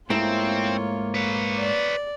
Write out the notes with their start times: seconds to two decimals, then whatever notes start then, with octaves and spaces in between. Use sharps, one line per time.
0.10 G#2 A3 A#3 C4 E4 F4 C#5
1.14 B4 C#5
1.58 D5